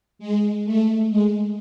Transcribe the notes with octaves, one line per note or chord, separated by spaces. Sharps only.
G#3
A3
G#3